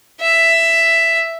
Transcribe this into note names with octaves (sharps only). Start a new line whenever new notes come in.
E5